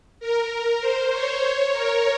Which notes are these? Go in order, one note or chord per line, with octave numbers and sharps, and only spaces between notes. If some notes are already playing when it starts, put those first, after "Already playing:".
A#4
A#4
C5
C#5
C#5
A#4